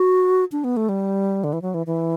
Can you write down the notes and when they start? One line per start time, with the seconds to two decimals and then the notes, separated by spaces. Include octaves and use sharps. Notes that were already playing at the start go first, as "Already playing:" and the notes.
Already playing: F#4
0.52 D4
0.64 B3
0.77 A3
0.89 G3
1.44 D3
1.53 E3
1.62 F#3
1.74 E3
1.87 E3